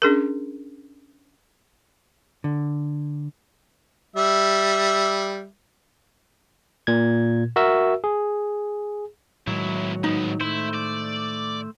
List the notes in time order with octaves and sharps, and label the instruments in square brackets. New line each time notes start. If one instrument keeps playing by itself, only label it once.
[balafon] C#4 D4 G#4 A#4
[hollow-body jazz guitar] D3
[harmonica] G3 E5
[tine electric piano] A#2 G#6
F#4 A#4 E5 E6
G#4
[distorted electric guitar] B1 E4 [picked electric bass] A2 D#3 G#3 [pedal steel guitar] F#3
[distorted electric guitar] G#2 B3 [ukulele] D#4
[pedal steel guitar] A3 C5 [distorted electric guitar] E4
[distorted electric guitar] D5